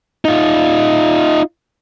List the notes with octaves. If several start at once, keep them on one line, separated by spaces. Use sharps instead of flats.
D#4 F4